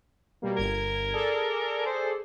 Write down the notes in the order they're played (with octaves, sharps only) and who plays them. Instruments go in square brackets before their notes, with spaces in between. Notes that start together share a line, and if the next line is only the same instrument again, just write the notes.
[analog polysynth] B2 G3 A#3
[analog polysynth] G1 G#6 [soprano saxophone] A#4
[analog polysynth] G#4 A4 D5
[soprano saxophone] C5